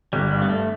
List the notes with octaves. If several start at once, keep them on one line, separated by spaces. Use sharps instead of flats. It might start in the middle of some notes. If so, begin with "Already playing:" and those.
G1 G3
G3
G2
B3
A3